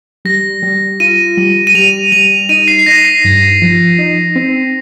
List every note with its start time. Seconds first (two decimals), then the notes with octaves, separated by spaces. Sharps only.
0.25 G3 A#6
0.62 G3
1.00 F4 D#7
1.37 G3
1.67 D#7
1.75 G3 F7
2.12 G3 F7
2.49 D#4 D#7
2.68 C7
2.79 C7
2.86 D#4 A#6
3.05 C7
3.25 G2
3.62 F3
3.99 D#4
4.36 C4